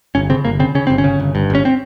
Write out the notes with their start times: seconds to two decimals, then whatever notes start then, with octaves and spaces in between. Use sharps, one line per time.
0.15 G1 C#4
0.30 C#3 C4
0.45 G1 A#3
0.59 C#3 C4
0.75 C#3 C#4
0.87 G1 C4
0.98 C#4
1.04 C#3
1.20 G1
1.35 G2
1.50 G1 C#4
1.65 C4